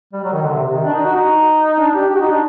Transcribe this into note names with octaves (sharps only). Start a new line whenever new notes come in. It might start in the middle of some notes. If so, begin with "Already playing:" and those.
G3
F#3
D#3
D3
C3
C3
D#3
D4
D#4
F#4
D#4
D4
G4
G4
F#4
D#4
D4